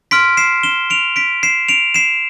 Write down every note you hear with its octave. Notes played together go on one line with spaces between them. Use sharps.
C6 F6 B6 D7
C7 E7
E7 G7
D7 F7
B6 D7
C7 E7
D7 F7
C7 E7